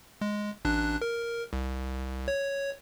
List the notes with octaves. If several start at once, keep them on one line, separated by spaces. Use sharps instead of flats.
G#3
A1 D4 F#6
A#4
C2
C#5